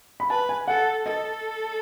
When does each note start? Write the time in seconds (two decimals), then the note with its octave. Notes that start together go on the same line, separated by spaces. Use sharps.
0.20 B5
0.30 B4 A5
0.49 G#5
0.68 A4 F#5
1.06 A4 D#5